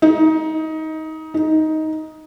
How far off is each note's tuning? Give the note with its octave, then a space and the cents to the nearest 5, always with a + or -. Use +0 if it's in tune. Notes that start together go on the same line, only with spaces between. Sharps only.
D#4 +20
D#4 +10